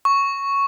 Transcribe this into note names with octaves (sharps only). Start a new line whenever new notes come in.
C#6